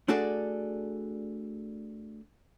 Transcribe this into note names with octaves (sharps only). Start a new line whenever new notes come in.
A3 D4 F#4 G#4 A4 D5